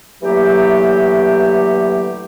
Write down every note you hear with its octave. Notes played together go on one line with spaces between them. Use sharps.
D3 E3 F#3 A3 A#3 G4